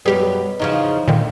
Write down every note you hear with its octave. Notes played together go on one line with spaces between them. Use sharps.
F#2 B2 G3 G4 G#4
E2 C#3 F3 D#4
D2 A#2 D3 D#3